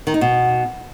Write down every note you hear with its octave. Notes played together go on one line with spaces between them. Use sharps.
D#3
D#4
B2